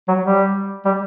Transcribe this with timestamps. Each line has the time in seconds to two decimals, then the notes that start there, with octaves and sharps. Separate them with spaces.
0.08 F#3
0.24 G3
0.85 G3